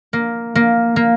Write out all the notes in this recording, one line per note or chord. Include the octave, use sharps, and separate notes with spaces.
A#3
A#3
A#3